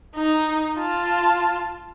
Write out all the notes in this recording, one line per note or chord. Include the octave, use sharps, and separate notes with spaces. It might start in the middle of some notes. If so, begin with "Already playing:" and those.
D#4
F4 A5